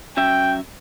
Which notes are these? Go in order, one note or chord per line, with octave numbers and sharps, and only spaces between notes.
F#3 C#4 E5 G5